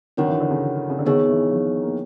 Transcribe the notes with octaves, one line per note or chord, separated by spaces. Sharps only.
D#3 D4 F#4 A#4 C#5 F#5
E3
D3
C#3
C#3
D3
D#3 B3 D#4 G#4 C#5
E3
F3
A#3